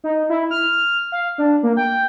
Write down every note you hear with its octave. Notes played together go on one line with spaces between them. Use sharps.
D#4
E4
F6
F5
D4
A#3
G5